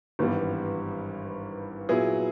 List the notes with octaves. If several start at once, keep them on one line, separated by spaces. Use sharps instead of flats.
G#1 G2 E3 G3 B3
A#2 F#3 B3 E4 G#4